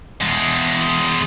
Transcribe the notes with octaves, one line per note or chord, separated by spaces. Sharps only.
E2 G#3